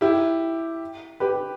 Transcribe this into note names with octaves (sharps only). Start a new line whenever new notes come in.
E4 G4
G4 B4